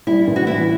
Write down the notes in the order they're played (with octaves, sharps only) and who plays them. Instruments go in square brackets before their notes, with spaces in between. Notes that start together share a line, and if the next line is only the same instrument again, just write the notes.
[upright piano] G3 [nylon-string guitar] E4
[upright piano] A1
[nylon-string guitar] F#4
[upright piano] E3 [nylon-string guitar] E4